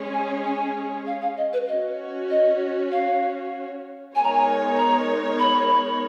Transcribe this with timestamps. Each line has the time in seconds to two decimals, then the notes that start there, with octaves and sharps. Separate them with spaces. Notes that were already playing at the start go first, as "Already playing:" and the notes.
Already playing: G#3 C#4 G#4 C#5
0.13 G#5
0.45 G#5
1.07 F5
1.22 F5
1.37 D#5
1.53 B4
1.68 C#4 F#4 C#5 D#5
2.30 D#5
2.92 F5
4.15 G#3 B3 D#4 A#4 C#5 G#5
4.24 A#5
4.33 G#5
4.77 A#5
5.39 B5